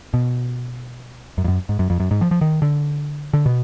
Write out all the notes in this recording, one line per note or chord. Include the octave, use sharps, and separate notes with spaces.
B2
F#2
F2
F#2
G#2
F#2
F2
F#2
G#2
F3
F3
D#3
D3
D3
B2